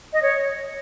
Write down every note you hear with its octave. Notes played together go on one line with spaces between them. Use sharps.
D#5
C#5